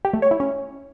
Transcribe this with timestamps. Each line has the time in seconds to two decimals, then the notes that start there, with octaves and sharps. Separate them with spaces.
0.05 G4
0.13 A3
0.22 C#5
0.31 E4
0.40 C#4